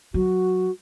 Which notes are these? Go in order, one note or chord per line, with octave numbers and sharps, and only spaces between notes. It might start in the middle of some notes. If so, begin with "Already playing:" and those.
F#3 F#4